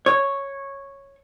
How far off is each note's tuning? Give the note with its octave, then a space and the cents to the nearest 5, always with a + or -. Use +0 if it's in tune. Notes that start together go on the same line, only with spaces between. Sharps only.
C#5 -5